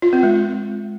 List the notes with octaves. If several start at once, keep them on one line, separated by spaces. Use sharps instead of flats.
F4
C4
G#3